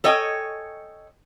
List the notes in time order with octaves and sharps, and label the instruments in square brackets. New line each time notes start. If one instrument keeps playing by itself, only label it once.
[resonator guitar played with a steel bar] A4 C#5 D#5 G5 G#5